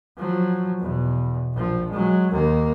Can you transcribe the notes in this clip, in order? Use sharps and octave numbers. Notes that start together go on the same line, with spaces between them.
F3 F#3
E2 B2
A#1 F3
F#3 G#3
D#2 A#3